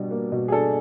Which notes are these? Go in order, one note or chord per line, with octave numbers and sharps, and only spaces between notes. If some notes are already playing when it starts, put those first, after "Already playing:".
Already playing: B2 G3 D4
A#3
B2
G#4
D4 A4